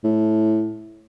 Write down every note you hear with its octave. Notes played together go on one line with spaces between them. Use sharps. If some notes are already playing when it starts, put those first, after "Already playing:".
A2